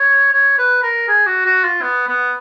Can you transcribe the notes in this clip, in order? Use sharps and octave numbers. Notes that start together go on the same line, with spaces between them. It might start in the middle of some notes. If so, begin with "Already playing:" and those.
Already playing: C#5
C#5
B4
A#4
G#4
F#4
F#4
F4
B3
B3